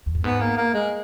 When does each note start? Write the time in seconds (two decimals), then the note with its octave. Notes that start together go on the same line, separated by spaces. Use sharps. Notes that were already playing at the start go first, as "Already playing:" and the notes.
0.06 E2
0.15 G2
0.24 G#2 B3
0.40 A#3
0.58 A#3
0.74 G#3